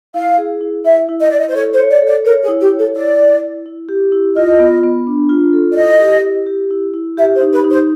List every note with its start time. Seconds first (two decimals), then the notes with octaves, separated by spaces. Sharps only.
0.14 E4 F5
0.38 G#4
0.61 E4
0.84 E4 E5
1.09 E4
1.20 D#5
1.30 E4 D5
1.39 D#5
1.49 C5
1.54 A4 C#5
1.72 C5
1.78 C#5
1.90 D5
2.02 A4
2.08 D5
2.25 A#4 C#5
2.43 G#4
2.48 E4
2.60 G4
2.72 C#5
2.78 A4
2.95 E4 D5
3.18 E4
3.43 E4
3.66 E4
3.89 G4
4.12 E4
4.36 F4 D#5
4.60 B3
4.84 B3
5.07 D4
5.29 F4
5.53 A4
5.71 D5
5.76 E4 D#5
6.00 G4
6.24 E4
6.46 G4
6.71 E4
6.94 E4
7.17 G4 E5
7.35 C5
7.41 D#4
7.53 B4
7.64 D#4
7.71 C5